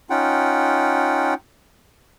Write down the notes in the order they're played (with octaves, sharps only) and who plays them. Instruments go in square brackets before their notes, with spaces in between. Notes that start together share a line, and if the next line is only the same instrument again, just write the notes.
[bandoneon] C#4 D#4 F4 F#5 G5